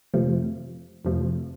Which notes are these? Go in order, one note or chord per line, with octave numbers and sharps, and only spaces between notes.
F2 C3 F3 A3
F2 C3 F3 A3